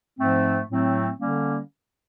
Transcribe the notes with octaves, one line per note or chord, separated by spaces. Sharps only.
G#2 F3 A3 C4
A2 F#3 A3 C4
D3 G3 A#3 C#4